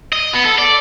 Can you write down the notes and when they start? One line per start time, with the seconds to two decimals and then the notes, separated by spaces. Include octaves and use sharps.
0.13 D#5
0.34 B3
0.45 A4
0.58 D5